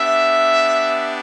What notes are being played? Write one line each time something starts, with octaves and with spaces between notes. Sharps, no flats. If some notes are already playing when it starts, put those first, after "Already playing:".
Already playing: B3 D4 G4 E5